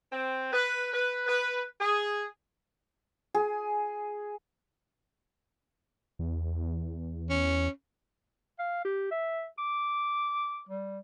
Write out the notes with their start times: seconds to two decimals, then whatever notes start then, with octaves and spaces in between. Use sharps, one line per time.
0.11 C4
0.52 B4
0.92 B4
1.26 B4
1.80 G#4
3.35 G#4
6.19 E2
7.30 C#4
8.59 F5
8.85 G4
9.11 E5
9.58 D6
10.69 G3